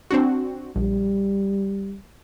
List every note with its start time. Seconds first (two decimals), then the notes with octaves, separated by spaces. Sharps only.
0.11 C4 D4 F#4
0.76 A#1 G3